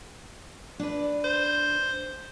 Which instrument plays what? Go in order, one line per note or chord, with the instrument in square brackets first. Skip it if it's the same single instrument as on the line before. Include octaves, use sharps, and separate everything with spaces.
[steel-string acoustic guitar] D4 B4
[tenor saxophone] C5